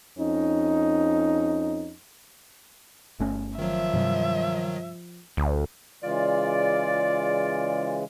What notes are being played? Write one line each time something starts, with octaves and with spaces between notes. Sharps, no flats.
F2 C#4 D#4
G1 A3 C#4
D#3 F3 F#3 E5
G2 C3 G3
D2
C#3 E3 G#3 F4 D5